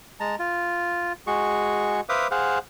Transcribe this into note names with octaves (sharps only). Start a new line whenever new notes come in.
G#3 A5 A#5
F4
G#3 F#4 G#4 C#6
B4 C5 E5 F5 D6 D#6
G#4 C5 F5 F#5